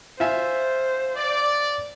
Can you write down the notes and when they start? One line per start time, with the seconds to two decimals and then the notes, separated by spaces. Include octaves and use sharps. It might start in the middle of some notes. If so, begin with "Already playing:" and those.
0.20 F4 C5 E5 G#5
1.17 D5